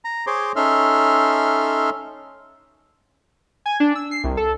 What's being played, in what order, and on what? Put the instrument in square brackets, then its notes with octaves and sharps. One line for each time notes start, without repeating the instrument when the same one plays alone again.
[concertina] A#5
G#4 C5 C#5 C6 D6
C#4 D#4 A4 E5 C6 F6
[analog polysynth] G#5
D4
E6
C7
C2
A4